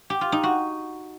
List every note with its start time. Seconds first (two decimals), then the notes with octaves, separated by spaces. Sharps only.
0.10 G4
0.21 F4
0.32 D#4
0.43 F#4